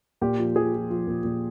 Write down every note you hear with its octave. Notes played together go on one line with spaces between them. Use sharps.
A#2 G4
F3
F3 G#4
F3
F3
A#2
A#2